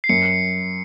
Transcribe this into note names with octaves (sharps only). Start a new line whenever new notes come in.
C7
F#2 C#7